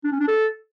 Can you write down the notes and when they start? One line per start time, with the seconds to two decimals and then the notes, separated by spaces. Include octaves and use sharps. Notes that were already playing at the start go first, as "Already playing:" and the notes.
0.04 D4
0.12 C#4
0.20 D4
0.28 A4